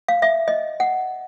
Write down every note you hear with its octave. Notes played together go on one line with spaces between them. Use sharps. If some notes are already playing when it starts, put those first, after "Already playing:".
F5
E5
D#5
F#5